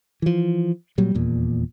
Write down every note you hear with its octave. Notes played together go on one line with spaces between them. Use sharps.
E3 F3
A#2 F#3 G3
D#1 E2 A#2